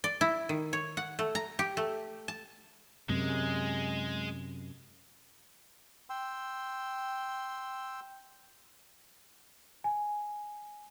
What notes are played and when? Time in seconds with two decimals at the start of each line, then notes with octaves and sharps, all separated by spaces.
0.04 D5
0.21 E4
0.49 D#3
0.73 C#5
0.97 F#5
1.19 A3
1.35 A#5
1.59 G4
1.77 A3
2.28 A5
3.09 F#2 C3 G#3
6.10 G5 C6 E6
9.84 G#5